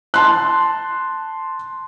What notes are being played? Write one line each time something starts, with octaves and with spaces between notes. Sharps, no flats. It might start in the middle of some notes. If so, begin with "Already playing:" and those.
A5 C6 F#6